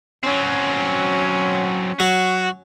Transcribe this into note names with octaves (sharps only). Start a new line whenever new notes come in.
F#3 C4 C#4
F#3 F#4